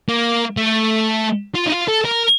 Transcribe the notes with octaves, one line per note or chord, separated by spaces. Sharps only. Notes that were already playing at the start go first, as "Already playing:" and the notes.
A#3
A3
F4
D#4
F4
A4
A#4